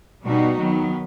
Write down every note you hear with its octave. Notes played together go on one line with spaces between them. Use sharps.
B2 G3 B3 D#4 F#4
D#3 F#3 B3